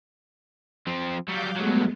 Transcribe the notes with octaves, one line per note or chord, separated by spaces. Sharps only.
F3 C4
F#3 G3 F5 D6 G6
G2 F#3 G#3 A3 B3